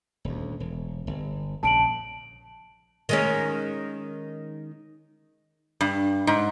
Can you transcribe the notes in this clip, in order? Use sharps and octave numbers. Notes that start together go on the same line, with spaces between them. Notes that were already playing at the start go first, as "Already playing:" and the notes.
D#1 D2
E1
G1
A#1 C#3 A5 D7 F#7
D#3 G#3 C#4
G2
G#2